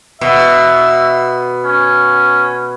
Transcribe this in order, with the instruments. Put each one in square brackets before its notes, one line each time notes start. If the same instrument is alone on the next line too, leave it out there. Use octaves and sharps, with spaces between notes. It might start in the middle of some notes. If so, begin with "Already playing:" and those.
[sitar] B2 [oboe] E5
[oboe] C#4